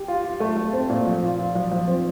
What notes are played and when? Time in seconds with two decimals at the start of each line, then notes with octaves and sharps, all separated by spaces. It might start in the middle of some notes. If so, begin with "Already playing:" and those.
Already playing: G4
0.08 F4
0.24 F4
0.40 A3
0.56 A3
0.73 C4
0.89 A#2
1.07 F3
1.23 F4
1.39 F4
1.55 F3
1.71 F3
1.87 C4